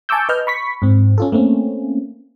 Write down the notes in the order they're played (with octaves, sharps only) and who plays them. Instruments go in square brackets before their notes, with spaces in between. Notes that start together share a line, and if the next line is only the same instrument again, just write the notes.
[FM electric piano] G#5 A5 C#6 D6 E6 G6
B4 D#5 F6 G6
B5 C#6 B6
G#2 C4
C#4 F4 A4
A3 A#3 C4 C#4